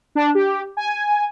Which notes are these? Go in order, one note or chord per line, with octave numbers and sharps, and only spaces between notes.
D4
G4
G#5